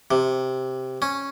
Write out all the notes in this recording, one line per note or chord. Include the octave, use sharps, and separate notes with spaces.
C3
C#4